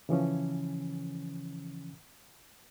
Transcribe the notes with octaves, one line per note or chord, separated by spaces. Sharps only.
C#3 E3 F3 C#4